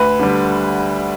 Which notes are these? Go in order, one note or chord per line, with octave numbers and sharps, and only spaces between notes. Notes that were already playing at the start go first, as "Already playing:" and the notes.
Already playing: D2 B4
D3 G3